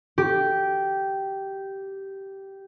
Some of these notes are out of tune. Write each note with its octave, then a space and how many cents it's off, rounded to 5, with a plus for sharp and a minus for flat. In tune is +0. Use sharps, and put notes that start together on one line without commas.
G4 -10